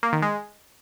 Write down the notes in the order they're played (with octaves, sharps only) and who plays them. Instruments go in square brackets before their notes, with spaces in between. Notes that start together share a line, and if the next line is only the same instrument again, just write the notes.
[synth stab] A#3
D#3
G#3